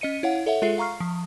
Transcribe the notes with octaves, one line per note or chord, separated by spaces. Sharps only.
C#4 D#5 C#7 D#7
E4 C#5 F5 F#5
A4 C#5 E5 F#5
G#3 F4 G#4 A4 E5 C7
F5 A#5 C#6 F6 C7
F3